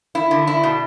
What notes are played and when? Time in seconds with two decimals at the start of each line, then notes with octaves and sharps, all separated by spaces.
0.15 E4
0.31 D3
0.47 E4
0.63 B2